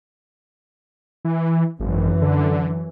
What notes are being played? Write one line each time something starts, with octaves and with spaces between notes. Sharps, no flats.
E3
G#1 F#2 E3
D3